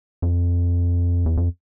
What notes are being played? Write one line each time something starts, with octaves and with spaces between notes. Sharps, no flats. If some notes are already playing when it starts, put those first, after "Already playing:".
F2
E2
F2